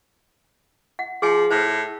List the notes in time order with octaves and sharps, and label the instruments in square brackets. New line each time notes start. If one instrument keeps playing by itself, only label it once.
[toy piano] F#5
[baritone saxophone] F3 [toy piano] G#4 G#5
[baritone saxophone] A2 [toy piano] C5